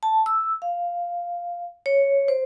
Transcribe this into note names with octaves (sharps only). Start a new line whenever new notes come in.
A5
E6
F5
C#5
C5